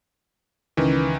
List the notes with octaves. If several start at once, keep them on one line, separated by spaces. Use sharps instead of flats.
C#2 D#3 E3 B4